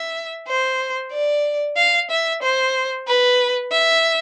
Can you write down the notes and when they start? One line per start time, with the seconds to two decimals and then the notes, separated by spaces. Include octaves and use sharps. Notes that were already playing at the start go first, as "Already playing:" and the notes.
Already playing: E5
0.47 C5
1.12 D5
1.76 F5
2.10 E5
2.42 C5
3.07 B4
3.71 E5